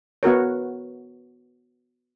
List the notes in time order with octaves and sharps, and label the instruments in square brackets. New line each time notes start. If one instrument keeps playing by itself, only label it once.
[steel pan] B3 F#4 A#4 C#5